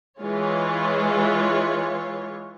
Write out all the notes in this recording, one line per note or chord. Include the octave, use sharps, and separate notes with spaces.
E3 G#3 F4 C#5